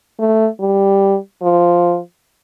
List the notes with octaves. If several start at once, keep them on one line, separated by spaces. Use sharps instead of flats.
A3
G3
F3